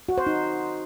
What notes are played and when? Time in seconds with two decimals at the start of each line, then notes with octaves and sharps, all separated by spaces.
0.09 F#4
0.18 C5
0.27 D#4